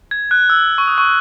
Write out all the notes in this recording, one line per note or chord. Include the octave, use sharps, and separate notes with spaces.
G#6
F#6
E6
C#6
D#6
C#6